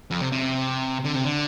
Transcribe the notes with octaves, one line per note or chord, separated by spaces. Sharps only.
F2
C3
C3
D3
C3
D3